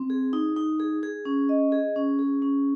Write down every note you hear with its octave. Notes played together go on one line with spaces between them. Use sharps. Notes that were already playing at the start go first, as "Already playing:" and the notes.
Already playing: C4
G#4
D#4
D#4
G#4
G#4
C#4
D#5
G#4
C#4
G#4
C#4